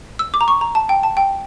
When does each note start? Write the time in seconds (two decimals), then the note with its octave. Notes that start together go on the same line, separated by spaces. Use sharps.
0.19 E6
0.34 D6
0.41 A#5
0.48 C#6
0.61 A#5
0.75 A5
0.89 G5
1.03 A5
1.17 G5